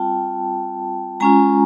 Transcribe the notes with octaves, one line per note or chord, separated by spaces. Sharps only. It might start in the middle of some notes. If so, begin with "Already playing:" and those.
Already playing: G3 C4 F4 G5 A5
G#3 C#4 F4 G#5 A#5